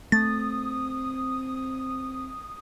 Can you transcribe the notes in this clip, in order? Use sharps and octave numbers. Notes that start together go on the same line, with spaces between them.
A3 C4 D#6 A6